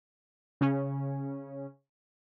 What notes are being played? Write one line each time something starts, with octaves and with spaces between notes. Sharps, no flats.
C#3 C#4